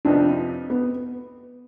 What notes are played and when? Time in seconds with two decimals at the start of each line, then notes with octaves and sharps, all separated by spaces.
0.05 F2 C3 F3 B3 D4 D#4
0.70 B3